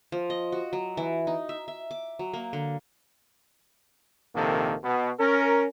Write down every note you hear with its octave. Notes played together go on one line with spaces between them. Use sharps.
F3
D#5
F#4
F#3
E3
D#4
E5
E5
D6
F#3
A#3
D3
A#1 C3 D#3 A#3 A4
B2
C#4 A#4